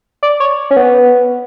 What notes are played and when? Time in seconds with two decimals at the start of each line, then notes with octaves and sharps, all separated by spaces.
0.23 D5
0.40 C#5
0.71 C#4
0.76 B3